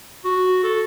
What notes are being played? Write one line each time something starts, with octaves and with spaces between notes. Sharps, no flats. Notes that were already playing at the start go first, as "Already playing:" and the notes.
F#4
A4